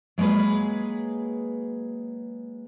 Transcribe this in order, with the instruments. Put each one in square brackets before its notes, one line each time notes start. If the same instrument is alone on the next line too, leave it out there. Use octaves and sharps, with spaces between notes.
[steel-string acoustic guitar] F#3 G#3 A#3 G#4 B4